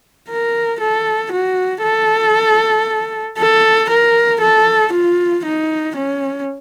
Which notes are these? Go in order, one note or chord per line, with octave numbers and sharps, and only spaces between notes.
A#4
A4
F#4
A4
A4
A#4
A4
F4
D#4
C#4